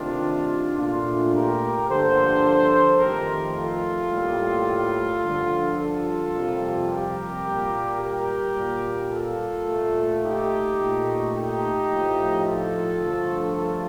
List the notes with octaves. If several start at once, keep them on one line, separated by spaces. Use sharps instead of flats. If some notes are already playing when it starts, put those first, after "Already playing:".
Already playing: C3 D#3 A3 D4 F4
A#2 A3 D4 F4
G4 A#4
G2 D3 F3 A#3 A4 C5
F2 D#3 A3 G4 A#4
F4 A4
A2 G3 A#3
G2 D3 F3
F4 A4
F2 C3 G3 A#3
G4 A#4
A#2 G3 A#3
G4 A#4
A#2 G3 A#3
F4 A4
A#2 A3
D#4 G4
A#2 A3
D#4 G4
A2 F3 A3
F4 A4
G2 D3 F3 A3
F4 A4